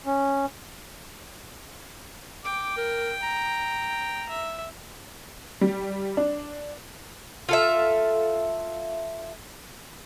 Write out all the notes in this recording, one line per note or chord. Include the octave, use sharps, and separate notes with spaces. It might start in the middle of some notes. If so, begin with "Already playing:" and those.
C#4
G5 D6
A#4
A#5
E5
G3
D4
F4 A4 E5